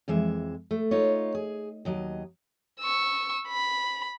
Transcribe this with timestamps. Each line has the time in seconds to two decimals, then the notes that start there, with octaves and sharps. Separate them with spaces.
0.08 F2 E3 G#3 E5
0.71 A3
0.91 D#4 F4 C#5
1.35 G#4
1.85 D#2 F#3 D#5
2.80 C#6 E6
3.49 B5